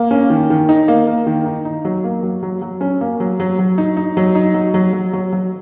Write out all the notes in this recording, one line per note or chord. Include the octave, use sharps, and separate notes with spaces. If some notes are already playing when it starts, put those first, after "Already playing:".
Already playing: A#3
C#4
D#3
D#3
D#4
A#3
A#3
D#3
D#4
D#4
F#3
A#3
F#3
F#3
F#3
C#4
A#3
F#3
F#3
F#3
D#4
D#4
F#3
D#4
F#3
F#3
F#3
F#3
F#3